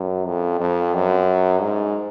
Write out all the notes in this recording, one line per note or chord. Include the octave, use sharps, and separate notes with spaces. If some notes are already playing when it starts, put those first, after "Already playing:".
Already playing: F#2
F2
F2
F#2
G#2